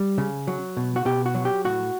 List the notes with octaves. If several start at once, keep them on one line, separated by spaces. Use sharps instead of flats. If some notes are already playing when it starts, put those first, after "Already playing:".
Already playing: G3
C#3
F#3
B2
F#4
B2 G4
F#4
F#3
G4
A2 F#4